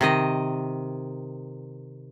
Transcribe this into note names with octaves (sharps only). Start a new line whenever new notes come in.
C3 D#3 D#5